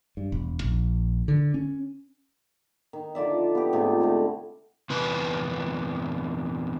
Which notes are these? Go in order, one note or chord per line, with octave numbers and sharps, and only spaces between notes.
G2
E1
A#1
D3
C#4
D#3
D3 F4 D5 E5
B3 G4
G#2 C3 A3 F4
D3 A3 E4
E2 C3 B4